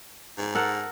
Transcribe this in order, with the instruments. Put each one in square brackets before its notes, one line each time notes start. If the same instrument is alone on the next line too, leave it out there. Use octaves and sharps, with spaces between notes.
[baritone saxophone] G#2
[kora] A4 A#4 F#5